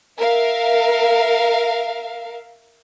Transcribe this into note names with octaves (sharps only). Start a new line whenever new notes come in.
A#4 E5 F5